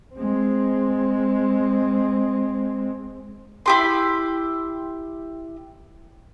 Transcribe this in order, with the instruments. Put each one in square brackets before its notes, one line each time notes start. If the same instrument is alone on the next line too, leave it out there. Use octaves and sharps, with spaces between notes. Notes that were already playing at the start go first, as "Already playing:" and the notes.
[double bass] G#3 C4
[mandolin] E4 G4 C6